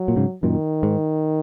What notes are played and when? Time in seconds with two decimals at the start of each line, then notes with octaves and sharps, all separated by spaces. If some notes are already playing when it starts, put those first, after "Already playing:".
Already playing: F#3
0.08 A#2
0.16 G#2 C#3
0.43 F#2 A#2 D#3
0.83 G#2